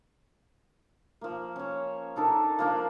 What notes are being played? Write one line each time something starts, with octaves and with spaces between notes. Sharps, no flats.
F3 A#3
C#4 C#5
D4 D#4 A4 A#4
F3 A#3 D4